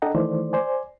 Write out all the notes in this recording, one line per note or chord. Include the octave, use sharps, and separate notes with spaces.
D4 A4 D#5 F#5 G5 A#5
D#3 E3 A3 C5 D5
C5 D5 G#5